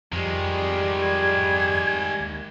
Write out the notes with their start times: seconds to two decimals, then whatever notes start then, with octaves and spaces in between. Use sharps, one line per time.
0.12 F2 D#3 G3 G#3
1.01 G#6
2.20 D#2